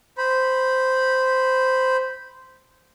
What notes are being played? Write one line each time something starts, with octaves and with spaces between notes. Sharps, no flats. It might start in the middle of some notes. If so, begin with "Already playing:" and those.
C5 B5